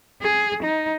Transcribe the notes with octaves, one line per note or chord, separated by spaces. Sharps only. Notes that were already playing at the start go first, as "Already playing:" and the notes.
G#4
D#4